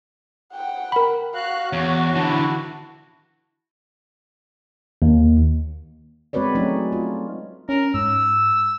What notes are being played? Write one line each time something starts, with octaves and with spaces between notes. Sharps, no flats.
F#5 G5
A#4 B5
F#4 F5 F#6
E2 F#4 C#5
D3 E3 E4 A5
D#2
G#3 C4 F#4 B4 C#5 D5
F#3 G#3 A3 C#4 D#4
F4
C#4 A#4
G#2 E6